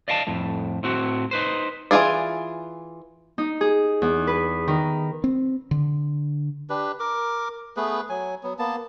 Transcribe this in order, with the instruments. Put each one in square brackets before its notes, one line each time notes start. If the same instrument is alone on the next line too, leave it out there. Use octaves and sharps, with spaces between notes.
[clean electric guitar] D5 D#5 F5 G5 A5
F2 A2
A2 C4 F#4
D#4 B4 C5
[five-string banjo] E3 A3 F4 G#4 D5
[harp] D#4
G#4
E2
B4
D#3
[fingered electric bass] C4
D3
[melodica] D4 G4 B4
A#4 D6
A3 B3 G#4 B4
F#3 G#5
F#3 B3
A#3 B3 A5